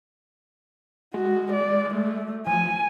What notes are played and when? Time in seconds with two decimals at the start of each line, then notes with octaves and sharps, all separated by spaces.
1.14 G#3 F#4
1.52 D5
1.95 A3
2.47 F3 G#5